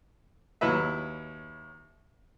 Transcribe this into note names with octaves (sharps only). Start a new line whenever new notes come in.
D#2 F#3 E4 B4 E5